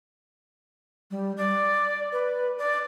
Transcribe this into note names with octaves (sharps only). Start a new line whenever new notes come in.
G3
D5
B4
D5